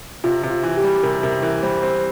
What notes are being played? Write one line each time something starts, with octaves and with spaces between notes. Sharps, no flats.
C3 F4
C3
F4
E3
G4
G3
C3 A#4
C3 A#4
E3 A#4
G3 C5
C4 C5